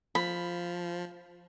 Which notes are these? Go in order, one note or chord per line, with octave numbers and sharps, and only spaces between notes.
F3 B5